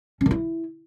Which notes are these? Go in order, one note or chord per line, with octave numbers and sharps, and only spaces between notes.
C#4
D#3
E4